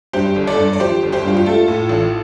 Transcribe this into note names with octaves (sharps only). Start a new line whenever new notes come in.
G2 G4 C5
G1
A4 D5
G2
D5
F3 G4 C5
G1
G4 C5
G2 F4
G4
A3 F4 A4
A2
A1